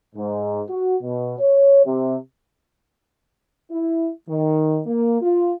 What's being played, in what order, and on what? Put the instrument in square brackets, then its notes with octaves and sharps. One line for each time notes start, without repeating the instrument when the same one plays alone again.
[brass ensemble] G#2
F#4
B2
C#5
C3
[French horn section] E4
D#3
A#3
F4